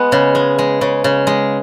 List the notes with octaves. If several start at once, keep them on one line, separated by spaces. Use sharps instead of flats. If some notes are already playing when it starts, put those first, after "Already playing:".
Already playing: G#3 B3
C#3
G#3
G#3
C#3
C#3
G#3